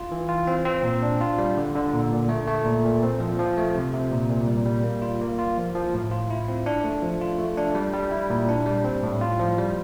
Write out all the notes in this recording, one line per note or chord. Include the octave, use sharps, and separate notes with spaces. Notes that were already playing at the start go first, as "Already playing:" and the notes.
Already playing: F4
E3
F4
C4
C4
A#2
D4
F4
G3
D3
D3
A#2
A#2
A3
A3
A#2
A#2
C4
F3
F3
A3
C3
C3
A#2
A#2
G3
G3
A#3
F4
A#3
F4
F3
F3
A2
F4
E4
C4
D4
A3
F3
F4
A3
D4
G3
G3
E4
A#2
D4
G3
C4
A2
F4
F3
G3